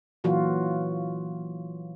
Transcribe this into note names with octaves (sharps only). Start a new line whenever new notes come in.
A#2 E3 F#3 F4 F#4